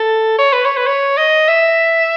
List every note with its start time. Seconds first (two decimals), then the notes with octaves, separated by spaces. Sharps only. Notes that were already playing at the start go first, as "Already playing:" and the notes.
Already playing: A4
0.39 C#5
0.53 B4
0.65 C#5
0.77 B4
0.87 C#5
1.18 D#5
1.48 E5